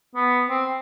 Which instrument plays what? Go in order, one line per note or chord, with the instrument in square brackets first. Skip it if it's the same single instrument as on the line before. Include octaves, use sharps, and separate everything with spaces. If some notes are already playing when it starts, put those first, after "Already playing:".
[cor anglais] B3
C4